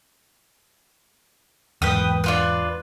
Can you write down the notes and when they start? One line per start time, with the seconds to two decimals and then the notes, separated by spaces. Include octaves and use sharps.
1.82 E2 G#2 B4 G5 D#6
2.24 D4 F4 B4